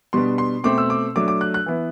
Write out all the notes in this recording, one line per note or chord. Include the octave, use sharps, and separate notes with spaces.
B2 G3 B3 D4 C6
C6
B2 A3 C4 D6
E6
D6
F#3 A3 D4 D6
D6
F#6
F#6
E3 B3 E4